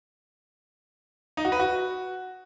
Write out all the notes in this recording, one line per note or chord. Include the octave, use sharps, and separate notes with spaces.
D#4
F#4
B4
F#4